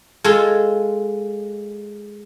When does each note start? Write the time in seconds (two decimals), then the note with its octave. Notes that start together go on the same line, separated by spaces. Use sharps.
0.24 G#3 F4 A4